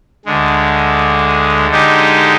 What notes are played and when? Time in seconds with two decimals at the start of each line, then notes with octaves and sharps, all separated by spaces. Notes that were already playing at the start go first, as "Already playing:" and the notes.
0.25 D2 D3 G#3
1.69 D3 G#3 D#4 G4